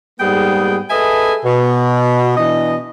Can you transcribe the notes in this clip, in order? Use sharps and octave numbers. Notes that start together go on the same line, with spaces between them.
G#2 G3 A#3 B3 G#4 G5
G#4 A4 B4 D#5 E5 G#5
B2
B2 E3 D4 D#5